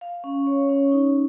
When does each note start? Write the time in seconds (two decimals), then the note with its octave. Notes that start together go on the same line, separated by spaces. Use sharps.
0.01 F5
0.24 C#4
0.47 C#5
0.69 C#4
0.92 D#4